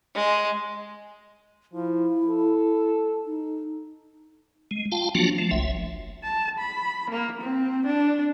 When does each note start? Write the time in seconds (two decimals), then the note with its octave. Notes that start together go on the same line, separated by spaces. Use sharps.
0.15 G#3
1.74 F3 E4
2.27 A4
3.26 D#4
4.71 G#3
4.92 F4 F5 G5 A5
5.15 F3 F#3 A#3 D4 F4 F#4
5.38 F3 A3
5.51 F#1 C2 E5
6.23 A5
6.59 B5
7.10 A#3
7.41 C4
7.86 D4